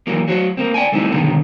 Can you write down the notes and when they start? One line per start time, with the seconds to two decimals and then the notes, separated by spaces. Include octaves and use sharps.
0.07 E3 F#3 A#3
0.28 F#3 F#4 C5
0.57 A#3 C4
0.74 D5 G5 G#5
0.92 G3 A3 C4 D#4 E4
1.11 G2 B2 D3 D#3